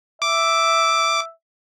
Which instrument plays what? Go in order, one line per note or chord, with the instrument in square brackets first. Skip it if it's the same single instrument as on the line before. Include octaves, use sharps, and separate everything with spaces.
[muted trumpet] E5 [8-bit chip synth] D6